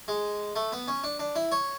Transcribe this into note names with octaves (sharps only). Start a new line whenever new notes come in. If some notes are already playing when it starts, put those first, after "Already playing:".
G#3
A3
B3
C#4
D4
D4
E4
C#5